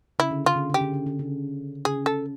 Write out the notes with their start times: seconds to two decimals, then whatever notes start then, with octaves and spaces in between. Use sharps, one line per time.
0.19 C#3 E4
0.31 D3
0.45 C#3 F4
0.56 D3
0.70 C#3 G4
0.81 D3
0.94 C#3
1.06 D3
1.19 C#3
1.85 C#3 G#4
2.06 A4